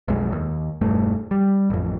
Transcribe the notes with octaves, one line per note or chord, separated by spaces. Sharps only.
B1 F2 G#3
D#2
E1 G2 A3
G3
A1 F2